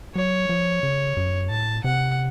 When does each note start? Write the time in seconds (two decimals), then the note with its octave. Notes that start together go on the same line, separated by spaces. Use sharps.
0.16 F#3 C#5
0.49 F3
0.83 C#3
1.17 F#2
1.50 A2 A5
1.84 C3 F#5